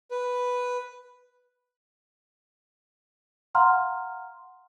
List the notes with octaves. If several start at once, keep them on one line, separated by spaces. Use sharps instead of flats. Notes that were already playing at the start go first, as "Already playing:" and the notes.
B4
F5 F#5 A#5 C6 F6